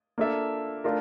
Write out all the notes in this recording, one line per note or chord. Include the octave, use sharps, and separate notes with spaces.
A#3 D4 F4 A4 E5
A3 D4 F4 A#4